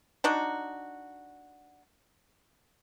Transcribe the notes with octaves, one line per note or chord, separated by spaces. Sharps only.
D4 D#4 F#4